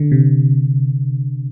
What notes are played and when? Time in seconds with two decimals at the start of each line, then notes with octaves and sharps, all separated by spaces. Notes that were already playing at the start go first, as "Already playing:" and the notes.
Already playing: D3
0.12 C3